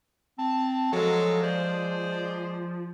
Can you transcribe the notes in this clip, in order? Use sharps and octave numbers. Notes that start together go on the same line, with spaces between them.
C4 A5
F3 F#3 G#3 A4
G#3 G#4 C5 D5